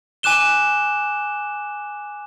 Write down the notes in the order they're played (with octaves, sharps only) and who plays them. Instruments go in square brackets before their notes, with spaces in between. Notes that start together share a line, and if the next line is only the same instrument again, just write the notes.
[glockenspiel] G#5 D6 F#6 E7 G7